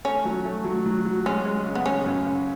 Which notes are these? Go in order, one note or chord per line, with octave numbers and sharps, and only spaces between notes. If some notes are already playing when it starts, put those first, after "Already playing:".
A3 C#4
F#3
A3
F#3
F#3
F#3
G#3 C#4
G#3
C#3
B3
C#3 C#4
F#2
C#3